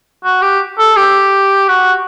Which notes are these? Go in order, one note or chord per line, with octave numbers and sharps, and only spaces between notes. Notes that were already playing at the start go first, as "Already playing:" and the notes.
F#4
G4
A4
G4
F#4